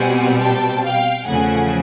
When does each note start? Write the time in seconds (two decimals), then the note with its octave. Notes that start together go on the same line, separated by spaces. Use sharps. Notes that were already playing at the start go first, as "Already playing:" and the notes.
Already playing: B2 G3 C4 F#5 G#5
0.41 G5 A5
0.84 F5 G5
1.27 E2 C#3 F3 A3 F#5 G#5